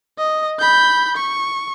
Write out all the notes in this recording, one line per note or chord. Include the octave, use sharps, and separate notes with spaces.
D#5
B5 G6
C#6